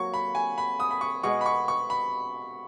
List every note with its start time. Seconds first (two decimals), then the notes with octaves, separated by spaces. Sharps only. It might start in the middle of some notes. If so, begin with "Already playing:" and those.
Already playing: F#3 A#3 C#6
0.14 B5
0.35 G#5
0.58 B5
0.80 D#6
0.91 B5
1.01 C#6
1.23 B2 G#3 B3 C#6
1.41 B5
1.46 C#6
1.68 C#6
1.90 B5